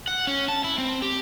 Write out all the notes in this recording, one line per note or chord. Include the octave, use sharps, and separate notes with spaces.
F#5
C#4
A5
E4
C4
G4